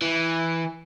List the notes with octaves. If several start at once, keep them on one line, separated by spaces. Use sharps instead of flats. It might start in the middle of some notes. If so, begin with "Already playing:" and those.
E3